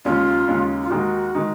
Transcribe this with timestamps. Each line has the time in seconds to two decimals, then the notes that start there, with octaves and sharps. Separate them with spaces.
0.05 D#2 C#3 G#3 C#4 F4
0.48 D#2 C#3 G#3 C#4
0.83 F4
0.91 D#2 D#3 G#3 D#4 F#4 G#4
1.35 D#3 G#3 D#4